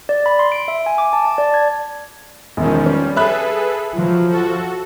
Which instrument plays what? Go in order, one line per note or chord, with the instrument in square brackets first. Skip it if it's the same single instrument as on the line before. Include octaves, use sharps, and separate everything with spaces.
[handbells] D5
B5
C6
D7
E5
G#5
D6
A5
A5
D5
G#6
[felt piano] E1 [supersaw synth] D#3 F3 C#4
[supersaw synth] G3 [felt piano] C#4
[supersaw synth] G#4 A4 B4 [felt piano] E5 B5 F#6
[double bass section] F3 [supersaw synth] F#3
[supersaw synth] F#4 A4